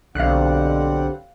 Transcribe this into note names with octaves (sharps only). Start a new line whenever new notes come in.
B1 D3 G3 C4 F5 F#5 F#6